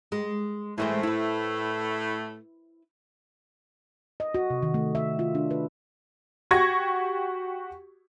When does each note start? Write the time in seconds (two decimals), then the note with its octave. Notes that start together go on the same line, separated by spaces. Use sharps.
0.12 G#3
0.78 A2 E3 G#3 A3 C4
1.03 E4 B4
4.20 D#5
4.34 F#4
4.50 C3
4.63 D#3
4.74 A3
4.95 E5
5.19 F4
5.35 D4
5.51 B4
6.51 F#4 G4 C#6 G#6 A#6